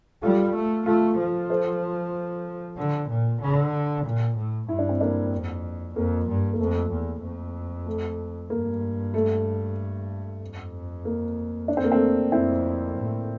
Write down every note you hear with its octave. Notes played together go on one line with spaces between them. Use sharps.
G3 F4 A4
A3
A3 F4 A4
F3
A4 C5
D3
A#2
D3
A#2
A2
G2 E4
D4
C4
A#3 D4
F2
F2 A#3
G2
A#3
F2 A3
E2
F2
A3
G2 A#3
A3
F2
A#3
D4
C4
A#3
A3 C4
F2 C4 E4
A2